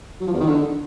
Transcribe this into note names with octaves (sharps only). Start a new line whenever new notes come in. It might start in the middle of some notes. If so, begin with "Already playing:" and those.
F#3
F3
E2
D#3
D3